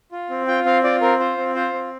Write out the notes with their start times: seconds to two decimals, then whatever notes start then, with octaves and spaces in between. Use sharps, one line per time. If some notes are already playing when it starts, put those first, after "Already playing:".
0.12 F4
0.30 C4
0.47 F4 G5
0.65 C4 F5
0.84 F4 D5
1.01 C4 A#4
1.19 F4 C5
1.37 C4
1.55 F4 C5
1.73 C4